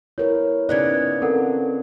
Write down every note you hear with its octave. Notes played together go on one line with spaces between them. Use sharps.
E4 A#4 B4 C#5
C#3 B3 D#4 D5 F#6 G#6
C4 A4 A#4 F#5